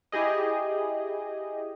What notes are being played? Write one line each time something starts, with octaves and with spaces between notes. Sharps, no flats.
E4 G4 G#4 D#5